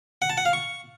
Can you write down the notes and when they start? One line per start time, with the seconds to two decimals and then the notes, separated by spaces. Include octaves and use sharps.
0.22 F#5
0.30 A5
0.37 F#5
0.45 F5
0.53 C#6